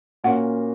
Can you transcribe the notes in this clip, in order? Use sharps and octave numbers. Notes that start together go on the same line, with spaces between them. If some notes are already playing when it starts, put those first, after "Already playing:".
A#2 A#3 C#4 F#4 A#4 F#5